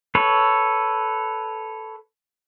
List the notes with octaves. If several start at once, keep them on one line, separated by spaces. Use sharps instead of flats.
A4 B4 C#5